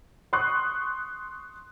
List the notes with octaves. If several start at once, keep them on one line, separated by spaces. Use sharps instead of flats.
C6 C#6 D#6 F#6